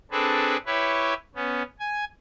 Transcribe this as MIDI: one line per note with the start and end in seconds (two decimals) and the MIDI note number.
0.11 0.57 60
0.11 0.57 62
0.11 0.57 68
0.11 0.57 69
0.11 0.57 71
0.66 1.14 64
0.66 1.14 67
0.66 1.14 71
0.66 1.14 73
1.35 1.63 59
1.35 1.63 61
1.79 2.05 80